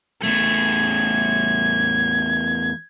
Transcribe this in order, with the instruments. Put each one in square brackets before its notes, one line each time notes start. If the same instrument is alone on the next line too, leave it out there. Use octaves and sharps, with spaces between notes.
[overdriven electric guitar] E2 A3 [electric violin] G#6